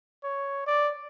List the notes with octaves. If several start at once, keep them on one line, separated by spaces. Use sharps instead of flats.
C#5
D5